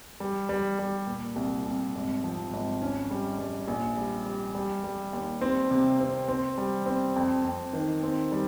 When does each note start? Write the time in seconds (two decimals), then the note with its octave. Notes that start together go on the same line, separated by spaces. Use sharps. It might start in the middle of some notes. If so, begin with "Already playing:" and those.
0.20 G3
0.49 G3
0.79 G3
1.07 A#2
1.36 C2
1.66 C2
1.95 G#1
2.24 F3
2.53 G#1
2.82 C#4
3.11 G3
3.39 G3
3.67 A#1
3.97 G3
4.26 G3
4.55 G3
4.84 G3
5.13 D#2
5.41 C4
5.71 C3
6.00 C4
6.28 C4
6.58 G3
6.86 C4
7.16 F2
7.44 F2
7.73 D#3
8.03 C4
8.32 G3